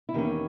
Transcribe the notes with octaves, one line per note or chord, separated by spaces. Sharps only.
E4
E2 D#3 A#3 C#4 G4